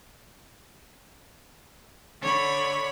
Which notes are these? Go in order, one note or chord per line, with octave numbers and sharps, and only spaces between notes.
D3 C#5 B5